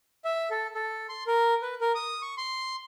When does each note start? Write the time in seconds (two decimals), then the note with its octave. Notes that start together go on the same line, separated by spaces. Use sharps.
0.25 E5
0.51 A4
0.75 A4
1.09 C6
1.27 A#4
1.62 B4
1.81 A#4
1.95 D#6
2.22 C#6
2.38 C6